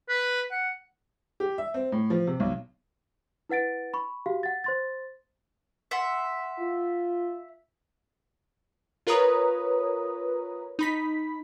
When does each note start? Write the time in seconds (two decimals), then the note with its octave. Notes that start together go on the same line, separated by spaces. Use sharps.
0.09 B4
0.51 F#5
1.40 G4
1.58 E5
1.74 C4
1.92 A2
2.10 F3
2.27 C3
2.40 B1
3.49 E4 B4 F#5 A6 D7
3.94 B5 C#6
4.26 F#4 G4 F5
4.43 F#5 A6
4.64 C5 C6 A6
5.91 E5 F#5 C6
6.59 F4
9.07 F4 A#4 B4 C#5 A#5 D#6
10.79 D#4 B5 B6